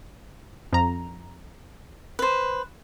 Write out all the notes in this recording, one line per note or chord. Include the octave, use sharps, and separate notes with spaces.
F2 A#5
B4 C5